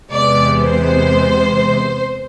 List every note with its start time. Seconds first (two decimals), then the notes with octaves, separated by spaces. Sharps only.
0.11 E2 C3 G#3 B3 D5
0.61 C5